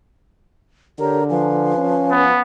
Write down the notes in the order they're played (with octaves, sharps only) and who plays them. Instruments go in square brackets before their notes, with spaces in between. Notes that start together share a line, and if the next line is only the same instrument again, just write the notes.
[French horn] D3 [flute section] G4 C#5 [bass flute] A#4
[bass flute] F3 [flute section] B4 F5 G#5
[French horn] C#4
[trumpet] B3